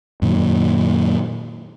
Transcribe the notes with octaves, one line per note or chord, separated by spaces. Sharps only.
F#2 A#2 D#3